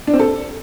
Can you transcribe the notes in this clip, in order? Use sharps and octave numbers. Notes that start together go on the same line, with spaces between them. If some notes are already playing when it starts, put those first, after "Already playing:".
D4
C4
A4